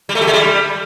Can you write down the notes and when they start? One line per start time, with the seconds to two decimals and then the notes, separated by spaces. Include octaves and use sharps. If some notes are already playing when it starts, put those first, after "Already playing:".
0.09 G3
0.15 A3
0.21 G4
0.27 G#3
0.33 G3